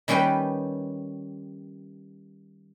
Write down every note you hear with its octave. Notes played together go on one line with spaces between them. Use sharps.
D#3 G3 C#4 B4 G5